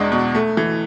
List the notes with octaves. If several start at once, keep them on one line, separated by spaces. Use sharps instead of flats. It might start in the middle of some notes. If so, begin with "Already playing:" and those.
Already playing: E2 B2 G#3 D4
B2
A3
E3